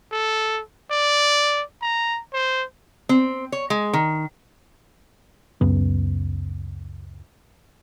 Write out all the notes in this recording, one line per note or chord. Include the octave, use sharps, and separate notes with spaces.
A4
D5
A#5
C5
C4
C#5
G#3
D#3
C#2 F#2 B3